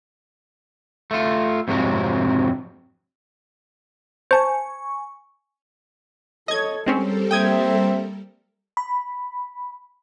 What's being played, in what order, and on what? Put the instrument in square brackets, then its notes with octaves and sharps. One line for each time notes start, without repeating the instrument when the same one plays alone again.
[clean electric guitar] A3 F4
F2 G#2 C3 F#3 G#3 C4
[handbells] C5 A5 [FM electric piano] G#5 C#6
[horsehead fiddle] A4 C#5 [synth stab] D#5 G#6
[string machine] G3 A4 A#4 [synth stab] G#3 C4 C#4 [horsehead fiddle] C5
[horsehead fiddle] A#3 E5 [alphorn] C4 [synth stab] G5 D#6 G#6
[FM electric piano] B5